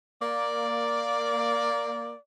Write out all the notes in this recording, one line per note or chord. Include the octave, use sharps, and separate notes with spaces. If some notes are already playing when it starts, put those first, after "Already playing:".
A#3 D5